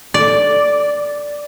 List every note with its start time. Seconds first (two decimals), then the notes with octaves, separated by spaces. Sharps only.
0.14 D5